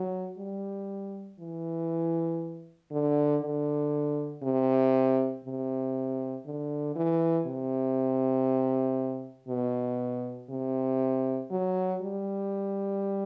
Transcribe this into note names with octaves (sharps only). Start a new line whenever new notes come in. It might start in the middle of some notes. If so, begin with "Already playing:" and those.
Already playing: F#3
G3
E3
D3
D3
C3
C3
D3
E3
C3
B2
C3
F#3
G3